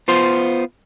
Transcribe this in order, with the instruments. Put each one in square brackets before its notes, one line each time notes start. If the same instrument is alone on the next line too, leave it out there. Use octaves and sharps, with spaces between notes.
[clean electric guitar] B3 F4 C5